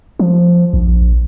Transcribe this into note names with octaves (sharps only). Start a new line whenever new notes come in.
F3
A#1